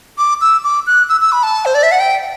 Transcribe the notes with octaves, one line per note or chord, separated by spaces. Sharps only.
D6
E6
D6
F#6
E6
E6
B5
A5
C5
D5
E5
F#5
G5